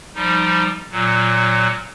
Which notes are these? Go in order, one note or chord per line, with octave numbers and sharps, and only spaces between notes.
F3 G3 D#4
A#2 F#3